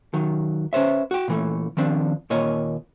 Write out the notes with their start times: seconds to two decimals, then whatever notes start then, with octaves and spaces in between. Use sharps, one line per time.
0.14 D#3 F#3
0.73 C#4 B4 C5 E5
1.11 F#4 G5
1.28 A#2 E3 A3
1.77 D#3 F3 C4 D4
2.30 D#2 A#2 A#3 C#5 D#5